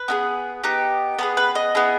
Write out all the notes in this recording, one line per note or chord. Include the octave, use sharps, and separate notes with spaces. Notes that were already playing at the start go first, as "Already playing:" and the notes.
Already playing: B4
B3 E4 G#4
B3 D#4 G4
B3 D#4 G#4 B4
B4
D#5
B3 E4 G#4